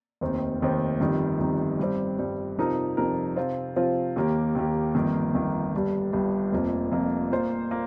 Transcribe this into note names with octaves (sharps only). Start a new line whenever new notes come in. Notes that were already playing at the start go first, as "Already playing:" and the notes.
F1 D#2 D#3 C4
F1 D#2 D#3 C4
G1 F2 D#3 G3 D#4
G1 F2 D#3 G3 D#4
G2 G3 C4
G2 G3 C4
F2 C3 F3 D#4 A#4
F2 C3 F3 D#4 A#4
C3 F3 C4 F4
C3 F3 C4 F4
D#2 D#3 A#3 G4
D#2 D#3 A#3 G4
G1 F2 D#3 A#3
G1 F2 D#3 A#3
G1 G2 G3
G1 G2 G3
F1 F2 F3 A#3
F1 F2 F3 A#3
A#2 A#3 F4 C5
A#2 A#3